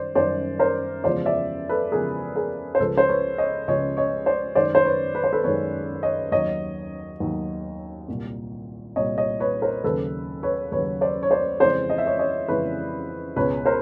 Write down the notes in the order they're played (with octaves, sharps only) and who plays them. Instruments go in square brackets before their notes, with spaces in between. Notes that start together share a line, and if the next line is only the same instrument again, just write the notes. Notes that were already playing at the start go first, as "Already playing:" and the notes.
Already playing: [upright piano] F#2 D#3 G3 C5 D5
F#2 D#3 G3 C5 D5
A#4 C5
E2 C#3 F3 G#3 C5 D5
D5 E5
A4 B4
E2 C#3 F3 G#3 G#4 A#4
G#4 A#4
C5
C#2 C#3 F3 G#3 A4 B4
C5
B4 C#5
C#5 D#5
C#2 C#3 F3 G#3 C#5 D#5
C#5 D#5
C5 D5
F#2 D#3 G#3 C5 D5
C5
B4 C#5
B4
C5
A4 B4
F#2 D#3 G#3 B4 C#5
C#5 D#5
D#2 D#3 F#3 C#5 D#5
D#2 D#3 F#3
C2 A#2 G3
C2 A#2 G3 C#5 D#5
C#5 D#5
B4 C#5
A#4 C5
D#2 C#3 F#3 A4 B4
B4 C#5
D#2 C#3 F#3 B4 C#5
C5 D5
C#5
C5 D5
F2 C#3 E3 G#3 C5 D5
D#5
E5
C#5 D#5
C#5 D#5
F2 C#3 E3 G#3 B4 C#5
C#2 B2 G#3 B4 C#5
A#4 C5